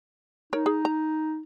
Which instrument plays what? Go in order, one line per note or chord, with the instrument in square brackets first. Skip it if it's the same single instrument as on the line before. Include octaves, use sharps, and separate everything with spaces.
[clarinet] D#4 [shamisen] A#4 C#5
[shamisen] G#4
A#5